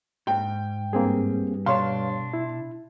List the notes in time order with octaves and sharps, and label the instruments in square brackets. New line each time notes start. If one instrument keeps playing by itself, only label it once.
[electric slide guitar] G#2 [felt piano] G5
[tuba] G2 [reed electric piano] A#3 C4 G#4
[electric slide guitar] B2 D4 [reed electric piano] C#5 F5 [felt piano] C6
[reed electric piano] E4